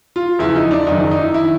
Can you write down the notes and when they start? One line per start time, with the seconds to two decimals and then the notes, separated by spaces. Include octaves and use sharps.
0.16 F4
0.39 E2 C#3 F3 E4
0.56 D#4
0.71 D4
0.87 F#1 F#2 D#3 D#4
0.99 D4
1.11 D#4
1.23 E4
1.34 D#3 E4